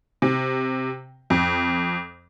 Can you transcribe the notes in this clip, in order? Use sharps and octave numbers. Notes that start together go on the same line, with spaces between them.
C3
F2